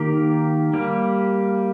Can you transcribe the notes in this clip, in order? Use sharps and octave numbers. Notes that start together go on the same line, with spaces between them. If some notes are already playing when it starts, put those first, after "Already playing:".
Already playing: D#3 A#3 G4 A#4
G3 A#3 G4